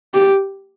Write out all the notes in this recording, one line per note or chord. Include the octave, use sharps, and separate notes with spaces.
G4